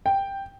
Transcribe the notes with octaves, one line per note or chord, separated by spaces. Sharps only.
G5